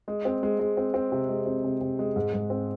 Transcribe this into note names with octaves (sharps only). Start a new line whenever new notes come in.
G#3
C4
G#3
G#3
C4
C4
C3
G#3
C4
C3
C3
G#3
G#2
G#2
C4